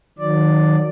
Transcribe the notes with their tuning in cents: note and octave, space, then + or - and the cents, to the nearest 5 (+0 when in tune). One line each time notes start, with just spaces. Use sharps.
D#3 -10 F#3 -35 D5 +0